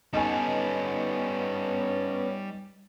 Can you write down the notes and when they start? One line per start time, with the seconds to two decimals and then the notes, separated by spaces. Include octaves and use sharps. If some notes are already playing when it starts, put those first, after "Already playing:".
0.14 G3 B3 C#4 D#4 A4 G#5